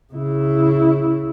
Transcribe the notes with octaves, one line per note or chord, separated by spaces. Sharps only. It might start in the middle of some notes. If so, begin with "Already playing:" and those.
C#3 E4